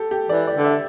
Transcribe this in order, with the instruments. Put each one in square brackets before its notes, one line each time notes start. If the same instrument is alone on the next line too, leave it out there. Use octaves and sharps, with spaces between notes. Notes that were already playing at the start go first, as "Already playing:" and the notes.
Already playing: [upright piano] G4 A4
G4
[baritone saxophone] E3 [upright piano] D5
[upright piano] D5
[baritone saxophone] D3
[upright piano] E5